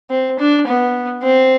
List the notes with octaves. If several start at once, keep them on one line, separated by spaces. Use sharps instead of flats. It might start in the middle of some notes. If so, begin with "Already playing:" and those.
C4
D4
B3
C4